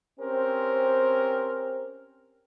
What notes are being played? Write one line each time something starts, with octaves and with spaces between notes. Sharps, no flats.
C4 C#4 G4 A#4 C5